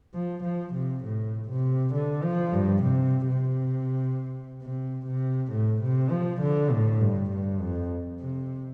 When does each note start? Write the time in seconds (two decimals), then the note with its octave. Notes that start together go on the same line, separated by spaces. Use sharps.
0.14 F3
0.44 F3
0.74 C3
1.04 A2
1.49 C3
1.94 D3
2.23 F3
2.53 G2
2.83 C3
3.28 C3
4.62 C3
5.06 C3
5.51 A2
5.82 C3
6.11 F3
6.42 D3
6.71 A2
7.01 G2
7.31 G2
7.60 F2
8.20 C3